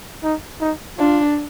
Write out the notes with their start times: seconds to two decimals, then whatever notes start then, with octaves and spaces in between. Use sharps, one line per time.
0.23 D#4
0.61 D#4
0.98 D4 F4